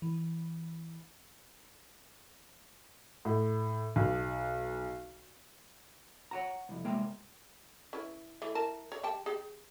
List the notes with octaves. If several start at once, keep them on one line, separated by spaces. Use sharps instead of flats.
E3
A2
B1
C#5 F#5 A#5
C2 F2
C2 G2 G#3 A#3 E5 G5
C#4 E4 B4
E3 A3
E4 A#4 A5
C#5 D5
G3 G5 A5
G4 G#4